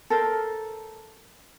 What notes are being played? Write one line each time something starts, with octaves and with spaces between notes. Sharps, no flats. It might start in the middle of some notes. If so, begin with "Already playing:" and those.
A4 A#4 C5